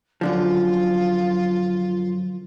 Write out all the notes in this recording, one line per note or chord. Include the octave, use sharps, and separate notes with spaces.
F#2 D3 F3 F4